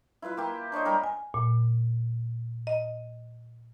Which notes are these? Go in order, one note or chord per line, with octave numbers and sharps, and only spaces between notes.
E4 F4 B4 E5
A#3 G4
D4 C5 C#5 D#5
G3 A#4 C5 B5
G#5
A#2
D#5